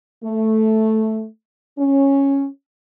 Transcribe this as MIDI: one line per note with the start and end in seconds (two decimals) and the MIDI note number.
0.23 1.26 57
1.79 2.46 61